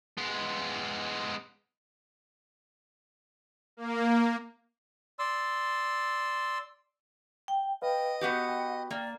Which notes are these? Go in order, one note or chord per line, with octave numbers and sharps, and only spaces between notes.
G#3 B3
A#3
D5 C6 E6
G5
B4 D#5 F5 G5
B3 F#4 G4 F#5
G5
A#3 D5